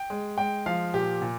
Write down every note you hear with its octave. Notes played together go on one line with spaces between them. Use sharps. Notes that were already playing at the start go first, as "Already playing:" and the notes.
Already playing: G5
G#3
G#3 G5
F3 F5
A#2 G4
A#2